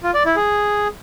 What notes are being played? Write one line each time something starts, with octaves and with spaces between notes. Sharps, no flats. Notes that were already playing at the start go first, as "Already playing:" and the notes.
F4
D5
E4
G#4